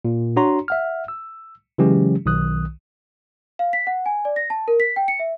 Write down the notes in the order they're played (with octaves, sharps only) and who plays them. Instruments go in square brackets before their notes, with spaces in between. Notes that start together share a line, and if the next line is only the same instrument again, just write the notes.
[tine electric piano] A#2
D4 F#4 C#5 A#5 C6
E5 F#5 F6
E6
C#3 E3 F#3 G#3 C#4 G4
B1 D#3 D#6 F#6
[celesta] F5
B6
F#5
G#5
D5
A#6
A5
A#4
B6
G5
C#7
E5